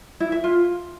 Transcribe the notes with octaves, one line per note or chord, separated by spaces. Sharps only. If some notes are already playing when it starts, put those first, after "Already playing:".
E4
E5
F4